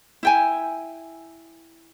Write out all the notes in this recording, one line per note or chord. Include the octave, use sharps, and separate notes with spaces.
E4 G5 G#5